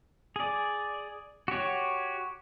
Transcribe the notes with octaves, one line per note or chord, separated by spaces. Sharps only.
G#4 D5
F#4 G4 C#5